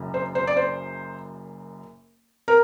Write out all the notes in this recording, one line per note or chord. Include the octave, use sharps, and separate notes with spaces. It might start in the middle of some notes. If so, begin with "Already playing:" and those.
Already playing: F#1 F#2
C5
C5
D5
C5
A#4